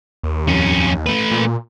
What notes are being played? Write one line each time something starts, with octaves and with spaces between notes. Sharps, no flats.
D#2
F2 C#4
A3 B4
A#2